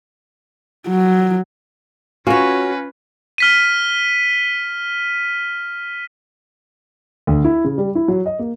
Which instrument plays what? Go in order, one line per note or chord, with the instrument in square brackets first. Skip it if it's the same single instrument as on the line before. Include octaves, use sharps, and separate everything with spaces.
[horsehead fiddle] F#3
[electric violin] C#4 B4 [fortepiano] F4 [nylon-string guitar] F#4 C#5 [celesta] G#5 A#6
[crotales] F6 B6 D#7
[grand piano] D2
E4
C#3
G3
E4
F#3
D#5
A#3